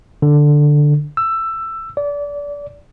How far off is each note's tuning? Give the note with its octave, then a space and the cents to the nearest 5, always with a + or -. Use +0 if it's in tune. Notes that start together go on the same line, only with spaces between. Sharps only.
D3 +5
E6 +15
D5 -25